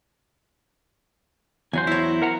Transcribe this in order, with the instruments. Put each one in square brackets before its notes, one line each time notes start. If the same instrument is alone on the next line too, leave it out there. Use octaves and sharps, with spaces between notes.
[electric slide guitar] E2 F#3 C5 [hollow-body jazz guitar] G#5
[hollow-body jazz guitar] E4 C#5
[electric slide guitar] A#4 F#5 A#5